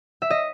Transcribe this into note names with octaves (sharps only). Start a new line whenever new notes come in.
E5
D#5